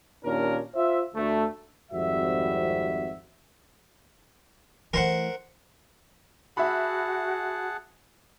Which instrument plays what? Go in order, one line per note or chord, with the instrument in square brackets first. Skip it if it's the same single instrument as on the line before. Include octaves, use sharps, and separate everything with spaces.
[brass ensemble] D#2 A#2 C#4 D4 A#4
F4 C5 E5
D2 A3
G#1 F2 G3 F#4 E5
[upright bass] E3 A3 [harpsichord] A#4 C5 F#5
[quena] F#4 [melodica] G#4 F#5 A5 [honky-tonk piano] E5 B5